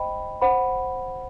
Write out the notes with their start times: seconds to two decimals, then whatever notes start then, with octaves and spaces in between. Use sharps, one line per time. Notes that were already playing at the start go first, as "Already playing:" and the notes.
Already playing: C5 D#5 G5 B5
0.42 C5 F#5 B5